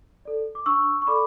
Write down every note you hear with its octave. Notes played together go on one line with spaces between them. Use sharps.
A4 D5
D6
D4 C#6 E6
C#6
A4 D5 B5 D6